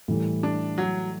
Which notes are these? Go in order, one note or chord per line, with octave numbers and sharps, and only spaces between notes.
A2 E3 G3
D4
F#3